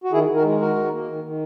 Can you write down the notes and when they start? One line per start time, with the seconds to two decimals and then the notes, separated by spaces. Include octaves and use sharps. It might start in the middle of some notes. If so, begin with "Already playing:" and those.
0.04 F#4
0.12 D#3 E4 G#4
0.28 D#3
0.36 F#4 A#4
0.44 G#3
0.60 D#3 F#4 A#4
0.76 D#3
0.91 A#3
1.07 D#3
1.24 D#3